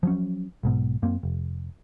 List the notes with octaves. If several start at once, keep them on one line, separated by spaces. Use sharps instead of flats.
F3 F#3 C#4
B1 G#2 B2
F#2 A#3 C4
F1